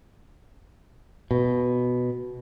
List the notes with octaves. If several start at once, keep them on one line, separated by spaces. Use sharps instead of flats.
B2